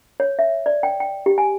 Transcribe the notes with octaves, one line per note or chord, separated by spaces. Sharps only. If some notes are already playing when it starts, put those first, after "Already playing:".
C#5
E5
D5
G5
G5
G4
G#5